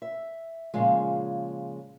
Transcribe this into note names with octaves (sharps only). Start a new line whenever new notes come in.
E5
A#2 C#3 F3 G#3